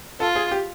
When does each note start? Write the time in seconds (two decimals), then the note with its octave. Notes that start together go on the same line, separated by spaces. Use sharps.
0.20 F4 A4
0.35 G#4
0.51 G4